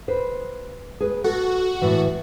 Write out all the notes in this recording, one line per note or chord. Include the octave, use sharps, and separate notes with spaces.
B4 C5
G#4 B4
F#4 A4
A2 E3